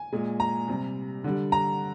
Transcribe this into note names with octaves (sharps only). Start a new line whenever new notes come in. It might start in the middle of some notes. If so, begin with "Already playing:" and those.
Already playing: G#5
A#2 G#3
A#5
C3 G3
D3 G3
A#5